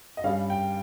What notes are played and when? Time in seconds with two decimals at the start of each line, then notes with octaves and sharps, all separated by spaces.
0.17 D#5
0.24 G2 G3 C#4 F5
0.50 G5